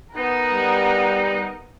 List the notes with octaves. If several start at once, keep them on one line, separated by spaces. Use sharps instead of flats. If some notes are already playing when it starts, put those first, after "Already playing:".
B3 D#4 A#4 F#5
G3